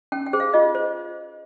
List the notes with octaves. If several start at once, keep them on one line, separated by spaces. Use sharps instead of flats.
C#4 G5
G5
G#4 C5
F5
F4 D#5
C5